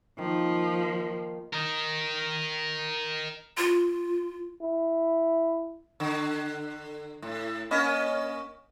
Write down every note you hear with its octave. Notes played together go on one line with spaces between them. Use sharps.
D#3 F3 A#3
A#4 D#5
F4
E4
D3
A2
A#3 C#4 D#5